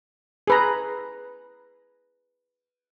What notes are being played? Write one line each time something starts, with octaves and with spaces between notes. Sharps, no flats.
G#4 B4 A#5